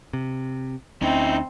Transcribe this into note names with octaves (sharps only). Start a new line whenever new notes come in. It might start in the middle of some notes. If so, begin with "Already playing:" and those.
C3
D2 C4 C#4 D#4 E4